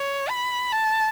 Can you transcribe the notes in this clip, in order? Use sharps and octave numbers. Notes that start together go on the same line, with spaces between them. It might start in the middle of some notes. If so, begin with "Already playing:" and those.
Already playing: C#5
B5
A5